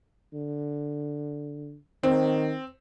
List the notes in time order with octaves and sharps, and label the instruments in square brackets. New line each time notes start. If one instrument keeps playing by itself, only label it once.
[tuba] D3
[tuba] D#3 [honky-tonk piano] C4